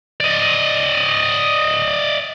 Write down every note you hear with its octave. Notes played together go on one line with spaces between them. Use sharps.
D5 D#5